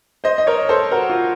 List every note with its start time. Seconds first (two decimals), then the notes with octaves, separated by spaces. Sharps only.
0.24 C5 D#5
0.38 D#5
0.47 A#4 C#5
0.69 A4 C5
0.91 F#4 A#4
1.10 F4